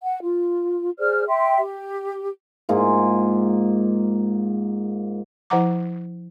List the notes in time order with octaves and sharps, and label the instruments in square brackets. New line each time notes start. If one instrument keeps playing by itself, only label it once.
[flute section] F#5
F4
G#4 C5 D5 F6
E5 G5 C6
G4
[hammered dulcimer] G#2 A#3 F4
[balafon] F3 E4 D#5 F#5 A#5 D6